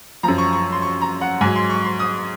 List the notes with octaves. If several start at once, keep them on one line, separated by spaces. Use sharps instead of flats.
F#2 F3 A#5
C#6
C#6
C6
C#6
A#5
F#5
G#2 F#3 G#5
C6
C#6
C6
D#6